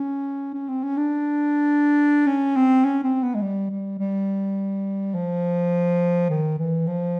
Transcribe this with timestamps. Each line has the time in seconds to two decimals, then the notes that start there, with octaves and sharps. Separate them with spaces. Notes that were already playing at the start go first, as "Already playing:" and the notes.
Already playing: C#4
0.54 C#4
0.69 C4
0.83 C#4
0.98 D4
2.27 C#4
2.56 C4
2.84 C#4
3.04 C4
3.23 B3
3.35 G#3
3.42 G3
3.71 G3
3.99 G3
5.15 F3
6.30 D#3
6.59 E3
6.87 F3